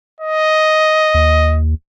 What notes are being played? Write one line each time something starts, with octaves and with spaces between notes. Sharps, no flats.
D#5
D#2